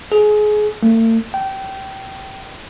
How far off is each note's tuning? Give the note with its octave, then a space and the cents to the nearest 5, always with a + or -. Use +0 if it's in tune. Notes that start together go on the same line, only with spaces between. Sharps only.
G#4 +25
A3 +45
G5 -20